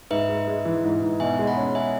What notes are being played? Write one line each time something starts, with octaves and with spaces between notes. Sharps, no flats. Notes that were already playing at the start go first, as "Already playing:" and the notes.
G#2 B4 E5
G#3
G#3
E3
G#2
G#2
B2 E5 G#5
G#3
F#5 B5
C#4
E5 G#5